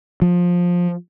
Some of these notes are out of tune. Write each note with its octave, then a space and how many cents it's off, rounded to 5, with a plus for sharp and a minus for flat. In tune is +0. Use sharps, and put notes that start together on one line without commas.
F3 +15